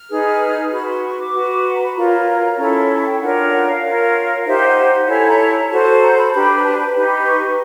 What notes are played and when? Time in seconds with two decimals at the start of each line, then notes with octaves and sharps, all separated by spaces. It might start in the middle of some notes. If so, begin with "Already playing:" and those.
Already playing: F6
0.10 D#4 G#4 B4
0.71 F#4 B4 B5
0.87 C6
1.03 C#6
1.18 D6
1.34 F#4 B4
1.65 C6
1.75 A#5
1.81 B5
1.96 F4 A#4 C#5 A#5
2.58 C#4 E4 A4
2.89 A5
3.05 G5
3.21 D4 F4 A#4 C#5 F#5
3.52 F#5
3.67 F5
3.84 F4 A#4 C#5
4.40 F5
4.45 D#4 G4 C5 E5
4.56 F5
4.66 F#5
4.77 F#5
5.07 E4 A4 C#5 G#5
5.27 A#5
5.38 A5
5.70 F#4 A4 C5 A5
6.02 A#5
6.17 B5
6.33 D4 G4 B4 B5
6.59 A#5
6.63 A5
6.79 B5
6.94 D#4 G4 B4
7.26 C#6